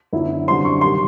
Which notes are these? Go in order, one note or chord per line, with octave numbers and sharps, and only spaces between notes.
F#2 D3 F#3 B3 E4
F#2 D3 G3 C4 C6
C#6
C3 D#3 G3 C6